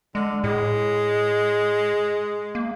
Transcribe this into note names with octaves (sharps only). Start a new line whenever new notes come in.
D3 G#3
A2 G#3
A#3